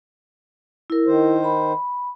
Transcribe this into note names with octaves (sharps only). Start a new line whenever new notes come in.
E4 A#4
D#3 C5
B5